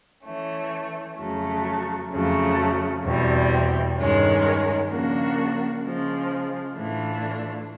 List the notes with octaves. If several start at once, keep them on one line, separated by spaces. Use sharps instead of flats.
E3 A3 C#4
F2 C#3 F#3 A3
F2 C#3 F#3 A3
E2 B2 G3 C4
G2 D#3 G#3 C#4
C#3 F3 A#3 D4 F#4
C#3 F3 G#3
A2 E3 A3 D4 F4